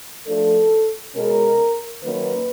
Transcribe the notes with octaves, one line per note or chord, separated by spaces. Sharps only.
F3 A3 D4 A4
B2 G#3 C#4 A#4
D#3 F#3 A#3 C#4 B4